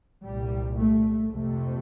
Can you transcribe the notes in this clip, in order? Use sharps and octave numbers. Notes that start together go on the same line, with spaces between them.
C2 A#2 G3
A3
F2 C3 A3